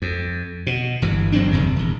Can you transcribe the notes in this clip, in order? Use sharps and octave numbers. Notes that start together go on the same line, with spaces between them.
F2
B2
G1 E3
G1 F#3 C4 D4
F#1 E2 C3 D#3
D#1 E2